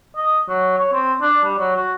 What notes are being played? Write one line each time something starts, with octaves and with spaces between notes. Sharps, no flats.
D#5
F#3
C#5
C4
D4
G3
F#3
F#4